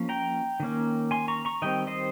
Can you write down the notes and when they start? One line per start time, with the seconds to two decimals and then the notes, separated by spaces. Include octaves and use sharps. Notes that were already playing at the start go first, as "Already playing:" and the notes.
Already playing: F3 A#3 C#4
0.09 G5 A#5
0.60 D#3 A#3 C#4
1.11 G#5 C6
1.28 A#5 C#6
1.45 A#5 C#6
1.62 D#3 G3 C4 D#5 G5
1.87 C5 D#5